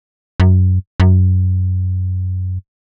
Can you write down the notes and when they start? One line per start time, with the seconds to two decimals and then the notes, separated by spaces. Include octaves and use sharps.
0.40 F#2
1.00 F#2